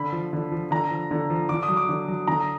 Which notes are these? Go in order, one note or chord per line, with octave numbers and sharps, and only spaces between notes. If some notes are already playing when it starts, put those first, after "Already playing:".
Already playing: D3 B5
F3
D3
F3
D3 A#5
F3
D3
F3
D3 D6
D#6
F#3
D6
D3
F#3
D3 A#5